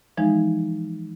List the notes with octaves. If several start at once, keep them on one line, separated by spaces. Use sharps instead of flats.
E3 F3 G#3 D#4